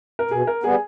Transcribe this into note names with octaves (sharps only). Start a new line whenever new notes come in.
A#4
B2 G#4
A#4
G3 B3 G#4